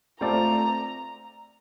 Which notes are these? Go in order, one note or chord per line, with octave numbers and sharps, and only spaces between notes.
A3 C4 F4 A4 D5 A#5